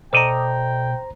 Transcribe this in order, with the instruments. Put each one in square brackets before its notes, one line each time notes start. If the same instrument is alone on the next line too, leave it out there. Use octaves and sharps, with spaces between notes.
[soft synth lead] B2 [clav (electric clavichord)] A4 D5 D#5 [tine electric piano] C5 A#5 [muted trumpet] G5